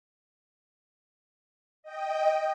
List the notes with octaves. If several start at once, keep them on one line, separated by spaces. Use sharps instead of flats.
D#5 G5